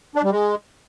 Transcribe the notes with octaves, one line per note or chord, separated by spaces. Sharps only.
D4
G3
G#3